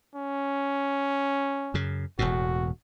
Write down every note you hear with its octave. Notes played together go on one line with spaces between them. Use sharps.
C#4
F#2 C#3
E1 E2 A2 F#4